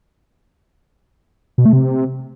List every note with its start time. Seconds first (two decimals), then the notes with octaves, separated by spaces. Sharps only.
1.58 B2
1.65 A3
1.73 C3